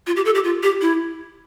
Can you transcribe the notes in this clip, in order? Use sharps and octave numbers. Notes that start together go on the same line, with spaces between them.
F4
G4
A4
G4
F4
G4
E4